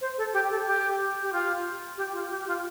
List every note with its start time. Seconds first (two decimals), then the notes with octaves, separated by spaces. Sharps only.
0.01 C5
0.18 A4
0.33 G4
0.50 A4
0.67 G4
1.22 G4
1.33 F4
1.97 G4
2.13 F4
2.30 G4
2.47 F4